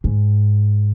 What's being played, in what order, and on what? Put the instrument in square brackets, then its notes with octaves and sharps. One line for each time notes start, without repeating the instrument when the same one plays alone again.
[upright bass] G#2